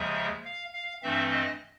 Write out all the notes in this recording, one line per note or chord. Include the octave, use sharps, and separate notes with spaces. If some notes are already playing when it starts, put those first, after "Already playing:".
Already playing: D#2 C#3 F3 G#3 E5
F5
F5
G2 E3 A3 C4 E5
D#5